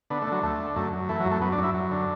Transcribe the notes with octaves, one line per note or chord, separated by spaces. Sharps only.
D3 B3
A3
D3 F#3
D2 A3
D3
F#2 A3
F#2
E3 A3
F#3
F#2
A3
F#2 B3
D4
F#2
E4
F#2
D3